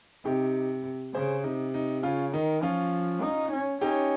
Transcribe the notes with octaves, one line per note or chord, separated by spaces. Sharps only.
C3 D#4 G4
C#3 G#4 C5
C3 D#4
D#4
C#3 C#4 F4
D#3 D#4
F3 C#4 F4
D#4
C#4
C#4 D#4 G4